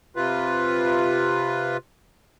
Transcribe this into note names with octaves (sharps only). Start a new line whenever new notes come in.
C3 F4 B4